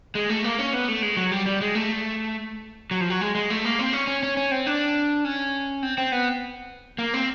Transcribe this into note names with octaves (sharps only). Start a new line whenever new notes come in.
G#3
A3
A#3
C#4
B3
A3
G#3
F#3
G3
G3
G#3
A3
F#3
F3
F#3
G#3
G#3
A3
A#3
C4
C#4
C#4
C#4
C#4
C4
D4
C#4
C4
C4
B3
A#3
C4